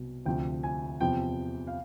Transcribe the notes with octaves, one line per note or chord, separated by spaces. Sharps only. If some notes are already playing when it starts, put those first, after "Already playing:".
Already playing: C2 B2 F#3
D2 C3 F3 G5
G#5
E2 C3 F3 G5
F5